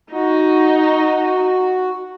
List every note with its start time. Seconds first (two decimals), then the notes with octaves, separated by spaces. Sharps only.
0.13 D#4 F#4